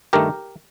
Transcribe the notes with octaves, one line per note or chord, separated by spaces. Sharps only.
G2 D#3 A3 G4 A#4